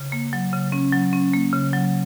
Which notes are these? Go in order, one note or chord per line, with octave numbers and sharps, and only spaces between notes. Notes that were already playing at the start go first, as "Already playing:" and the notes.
Already playing: C#3
A#3
F#3
C#3
C#4
F#3
C#4
A#3
C#3
F#3